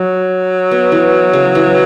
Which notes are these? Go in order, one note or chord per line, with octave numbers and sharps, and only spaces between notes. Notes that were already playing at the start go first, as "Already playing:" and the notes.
Already playing: F#3
B3
E3
C#3
E3